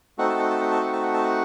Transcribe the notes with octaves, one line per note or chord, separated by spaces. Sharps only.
A3 C4 D#4 F#4 F#5
A5
F#5
A5
F#5
A5
F#5
A5
F#5
A5
F#5